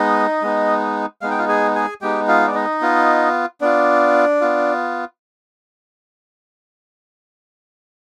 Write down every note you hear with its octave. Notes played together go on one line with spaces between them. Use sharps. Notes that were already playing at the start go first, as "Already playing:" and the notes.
Already playing: G#3 B3 D#4 D#5
G#3 B3 D#4
G#3 B3 D#4 F5
G5
F4 F5
G#4 G#5
G#4 G#5
G#3 B3 D#4 G4 G5
F4 F5
D5
D#4 D#5
B3 F4
B3 D4 F4 D5
B3 F4